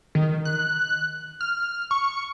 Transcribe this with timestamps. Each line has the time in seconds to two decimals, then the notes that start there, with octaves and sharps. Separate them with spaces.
0.15 D#3
0.45 F#6
1.41 F6
1.91 C#6